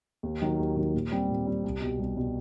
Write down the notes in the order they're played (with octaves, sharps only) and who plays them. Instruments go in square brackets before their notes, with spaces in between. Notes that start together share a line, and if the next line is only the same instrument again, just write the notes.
[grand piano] D#2
D#3 F#3
D#2
D#3 F#3
A#2
G3 C4
A#2
G3 C4
C2
B2 G3
C2
B2 G3